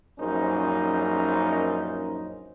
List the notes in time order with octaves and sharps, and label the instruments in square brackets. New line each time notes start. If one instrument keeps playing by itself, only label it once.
[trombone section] A#1 F#2 C#4 D#4 C5